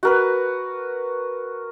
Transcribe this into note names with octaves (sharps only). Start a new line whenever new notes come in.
F#4 A#4 B4